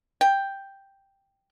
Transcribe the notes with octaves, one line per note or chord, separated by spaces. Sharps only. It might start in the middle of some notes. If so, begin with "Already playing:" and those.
G5